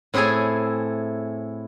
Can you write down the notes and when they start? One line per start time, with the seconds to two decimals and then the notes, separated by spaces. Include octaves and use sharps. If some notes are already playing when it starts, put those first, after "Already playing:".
0.14 A2 C4 E4 G#4 A4 G#5